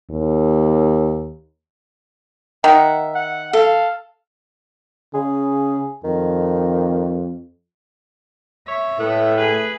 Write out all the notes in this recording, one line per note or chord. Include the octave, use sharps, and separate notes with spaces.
D#2
D#3 E5 F#5
F#5
A4 F5
C#3 G#4
F2 D#3
C#5 E5
A2 A3 B3
G#4 B4